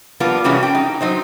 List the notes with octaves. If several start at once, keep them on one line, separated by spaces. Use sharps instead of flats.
F3 G3 A#3 B3 F4
C3 E3 G3 C#4 F#4 G#4
G5
D#4
F#3 D#4 C5